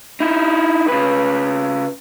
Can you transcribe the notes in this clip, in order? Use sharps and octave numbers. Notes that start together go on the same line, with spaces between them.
D#4 E4
C#3 B4